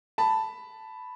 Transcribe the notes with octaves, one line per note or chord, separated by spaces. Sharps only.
A5 B5